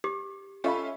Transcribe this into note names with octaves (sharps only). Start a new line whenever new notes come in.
G4 D6
C#4 F4 A4 C#5 D#5 E5 B5 C#6